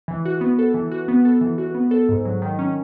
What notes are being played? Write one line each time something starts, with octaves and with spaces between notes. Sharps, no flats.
E3
F#4
B3
A4
E3
F#4
B3
A4
E3
F#4
B3
A4
G#2
F#3
D#3
C#4